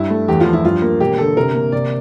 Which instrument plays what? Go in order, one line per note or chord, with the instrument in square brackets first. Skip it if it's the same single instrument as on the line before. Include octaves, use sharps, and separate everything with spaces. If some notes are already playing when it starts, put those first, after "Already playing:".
Already playing: [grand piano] G2 [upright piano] E4
[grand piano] A3
[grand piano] E2 [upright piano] G4
[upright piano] F4
[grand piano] F3
[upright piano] E4
[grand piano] G2 [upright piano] F4
[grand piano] A#3
[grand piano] E1 [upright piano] G4
[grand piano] D3 [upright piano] A4
[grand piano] C3 [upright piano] A#4
[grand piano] A#3
[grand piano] C3 [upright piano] D5